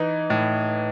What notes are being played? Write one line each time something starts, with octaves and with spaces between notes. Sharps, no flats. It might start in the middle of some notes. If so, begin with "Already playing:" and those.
Already playing: E3 D#4
A2